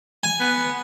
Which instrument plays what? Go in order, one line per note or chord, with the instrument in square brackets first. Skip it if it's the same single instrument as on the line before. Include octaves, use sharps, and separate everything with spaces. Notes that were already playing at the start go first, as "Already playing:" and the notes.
[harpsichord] G#5
[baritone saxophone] B3